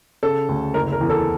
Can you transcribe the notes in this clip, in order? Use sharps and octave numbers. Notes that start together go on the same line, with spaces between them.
C#3 A4
D2
F#1 A#4
A#4
E2
A4